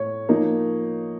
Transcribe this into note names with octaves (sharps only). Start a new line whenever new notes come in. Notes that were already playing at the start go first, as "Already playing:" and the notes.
Already playing: A2 C#5
F3 A#3 D#4